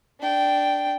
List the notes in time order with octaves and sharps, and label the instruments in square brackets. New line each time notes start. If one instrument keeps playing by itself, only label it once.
[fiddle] D4 G5